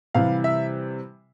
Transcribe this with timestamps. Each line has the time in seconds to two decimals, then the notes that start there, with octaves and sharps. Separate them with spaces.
0.14 C3 E3 G3 F5
0.44 E5